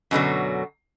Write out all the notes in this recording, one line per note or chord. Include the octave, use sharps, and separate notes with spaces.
F#2 B2 D3 F#3